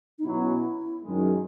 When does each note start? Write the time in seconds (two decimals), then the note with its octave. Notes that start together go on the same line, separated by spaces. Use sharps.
0.19 D#4
0.24 B2 F#3 C#4 E4
1.03 F#2 D#3 G#3